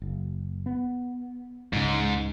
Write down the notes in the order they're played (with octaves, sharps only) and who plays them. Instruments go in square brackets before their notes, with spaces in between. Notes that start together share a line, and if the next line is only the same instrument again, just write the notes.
[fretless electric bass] F#1
B3
[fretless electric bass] C#2 C#3 [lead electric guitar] G#2